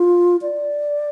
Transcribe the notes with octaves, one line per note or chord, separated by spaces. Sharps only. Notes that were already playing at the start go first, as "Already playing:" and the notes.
Already playing: F4
D5